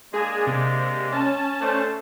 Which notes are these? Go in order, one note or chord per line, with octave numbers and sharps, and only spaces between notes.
G#3 A#3 D4 G#4 G#5
C3
C#4 A5
A3 D4 C5